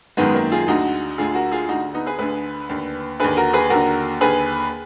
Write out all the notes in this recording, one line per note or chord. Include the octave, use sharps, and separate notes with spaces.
F#2 D#3 G#3 B3
A#3
F4 G#4
D2 D3 D#4 F#4
D2 D3 F4 G#4
F#4 A#4
F4 G#4
D2 D3 D#4 F#4
B3 D#4
G#4 B4
D2 D3 G#4 B4
D#2 D3
D#2 D3 G#4 B4
F#4 A#4
G#4 B4
D#2 D3 F#4 A#4
D#2 D3 G#4 B4